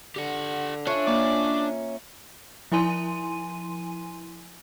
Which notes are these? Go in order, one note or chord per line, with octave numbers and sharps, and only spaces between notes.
D3 G4 F#5
C#4 D4 F4 A4 E5
A#3 D5
F3 E4 G#5 C6 D#7